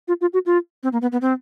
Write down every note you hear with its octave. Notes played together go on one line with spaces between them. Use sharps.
F4
F4
F#4
F4
C4
A#3
B3
B3
C4